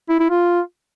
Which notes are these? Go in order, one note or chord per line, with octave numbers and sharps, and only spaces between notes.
E4
E4
F4